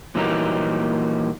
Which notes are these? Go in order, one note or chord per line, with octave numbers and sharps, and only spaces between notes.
A#2 E3 F#3 G3 A#3 D#4